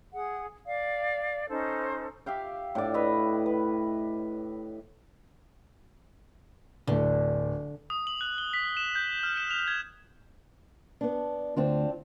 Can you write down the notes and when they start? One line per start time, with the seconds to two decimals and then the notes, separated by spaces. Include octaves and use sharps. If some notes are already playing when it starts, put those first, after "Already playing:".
0.14 G#4 F#5
0.67 D5 F5
1.49 C#4 D#4 A4 C5
2.26 G4 E5 F5 G5
2.75 A2 D4 D5
2.94 B4 C#5 D#5 E5
3.46 B4
6.87 D1 D3 A3
7.90 D#6
8.07 F#7
8.21 F#6
8.38 G7
8.53 B6
8.77 E7
8.95 G6
9.23 F6
9.37 E7
9.51 F7
9.68 G#6
11.01 B3 D4
11.56 D2 C4 D4 F4